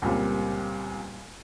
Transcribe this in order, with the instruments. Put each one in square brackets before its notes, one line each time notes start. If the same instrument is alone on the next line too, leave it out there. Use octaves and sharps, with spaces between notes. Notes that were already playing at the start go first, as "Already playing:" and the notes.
[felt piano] C#2 A#2 G3 C4